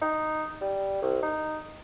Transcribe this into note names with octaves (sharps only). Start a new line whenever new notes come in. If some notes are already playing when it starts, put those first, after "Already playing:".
D#4
G3
C2
D#4